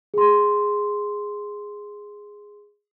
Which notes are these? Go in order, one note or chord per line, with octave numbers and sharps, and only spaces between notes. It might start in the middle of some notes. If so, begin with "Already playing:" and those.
G#4 C6